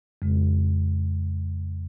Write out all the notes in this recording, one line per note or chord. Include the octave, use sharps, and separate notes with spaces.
F2 C#3 G#3